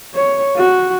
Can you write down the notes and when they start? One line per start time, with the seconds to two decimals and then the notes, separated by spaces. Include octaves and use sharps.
0.14 C#5
0.57 F#4